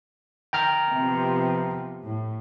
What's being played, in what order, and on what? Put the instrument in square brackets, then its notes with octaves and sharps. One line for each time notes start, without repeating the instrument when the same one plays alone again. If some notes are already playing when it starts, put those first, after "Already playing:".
[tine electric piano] G5 A#5 F6
[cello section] C3 F3 B3
A2